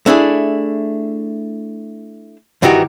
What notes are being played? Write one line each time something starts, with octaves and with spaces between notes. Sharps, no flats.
A3 D4 E4 G#4
G2 D#3 E3 D#4 F#4 G4